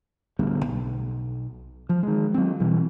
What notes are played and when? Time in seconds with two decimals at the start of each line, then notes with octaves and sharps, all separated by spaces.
0.39 D1 D2 G3 B3
0.66 B1
1.89 F3
2.03 D#3 G#3
2.34 F#3 C4
2.60 B2 E3 G3